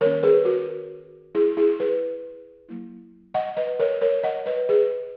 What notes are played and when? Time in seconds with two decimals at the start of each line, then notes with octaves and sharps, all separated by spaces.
0.01 D#3 A#3 C#4 A#4 C#5
0.23 G#4 B4
0.45 F#4 A#4
1.35 E4 G#4
1.57 E4 G#4
1.80 G#4 B4
2.69 F#3 A#3 E4
3.34 D#5 F#5
3.57 B4 D#5
3.79 A#4 C#5
4.01 A#4 C#5
4.23 D#5 F#5
4.46 B4 D#5
4.69 G#4 B4